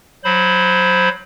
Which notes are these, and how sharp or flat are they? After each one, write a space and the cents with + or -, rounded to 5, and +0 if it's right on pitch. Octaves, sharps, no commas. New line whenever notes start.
F#3 +0 C5 +0 B5 +0